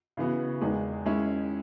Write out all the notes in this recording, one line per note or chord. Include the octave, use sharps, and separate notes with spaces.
C#3 E3 B3 F#4
E2 D#3 G#3
D#3 G#3 C#4 E4